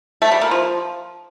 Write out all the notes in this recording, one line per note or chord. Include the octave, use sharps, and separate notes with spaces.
A3
G3
A#3
F3